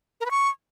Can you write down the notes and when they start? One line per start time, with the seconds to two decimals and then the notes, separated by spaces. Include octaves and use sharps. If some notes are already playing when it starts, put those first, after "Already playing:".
0.20 A#4
0.26 B4
0.31 C#6